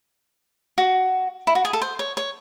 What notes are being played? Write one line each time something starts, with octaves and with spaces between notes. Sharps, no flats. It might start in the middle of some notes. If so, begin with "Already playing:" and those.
F#4
E4
F#4
G#4
A4
C5
C#5
C#5